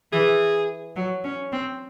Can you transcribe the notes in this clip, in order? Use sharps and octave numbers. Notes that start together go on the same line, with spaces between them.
E3 G#4
F#3
C#4
C4